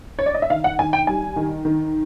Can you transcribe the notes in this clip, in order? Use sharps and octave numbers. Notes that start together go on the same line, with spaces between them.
C#5
D5
D#5
E5
D#3 F5
F#5
D#3 G#5
G5
G3 G#5
D#3
D#3